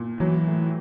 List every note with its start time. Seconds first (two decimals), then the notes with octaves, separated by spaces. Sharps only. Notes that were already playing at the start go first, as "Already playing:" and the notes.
Already playing: A#2
0.20 E3 F#3
0.47 A2